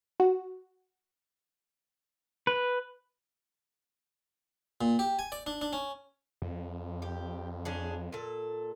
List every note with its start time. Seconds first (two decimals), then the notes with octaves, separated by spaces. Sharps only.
0.20 F#4
2.47 B4
4.81 A#2
4.99 G4
5.19 G#5
5.32 D5
5.47 D4
5.61 D4
5.73 C#4
6.42 F2
7.02 G4
7.65 C#4 D4 G#4
8.13 A#2 A4